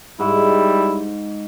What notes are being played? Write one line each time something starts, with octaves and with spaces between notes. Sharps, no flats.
G#2 G3 E4